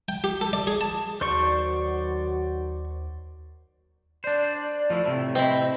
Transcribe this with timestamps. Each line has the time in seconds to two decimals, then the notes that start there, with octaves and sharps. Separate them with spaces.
0.09 G5
0.24 G4
0.41 A4
0.53 D5
0.67 G#4
0.81 A5
1.21 D#2 D#3 F#3 F#4 C5 D5 C#6
4.24 D4 C5 D5
4.90 F3 A3 E4
5.06 A2 C3 A3
5.35 C4 E4 D#5